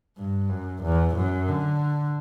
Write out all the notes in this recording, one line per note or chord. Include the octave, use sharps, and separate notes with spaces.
G2
F#2
E2
F#2
D3